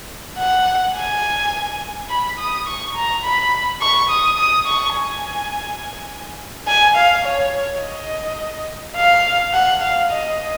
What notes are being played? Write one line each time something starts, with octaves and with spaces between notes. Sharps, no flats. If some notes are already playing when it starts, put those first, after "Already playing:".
F#5
G#5
B5
D#6
C#6
A#5
B5
C#6
D#6
D#6
C#6
G#5
G#5
F5
C#5
D#5
F5
F#5
F5
D#5